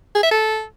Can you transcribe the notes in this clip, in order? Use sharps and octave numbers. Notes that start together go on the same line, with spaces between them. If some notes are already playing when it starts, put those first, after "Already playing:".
G#4
E5
A4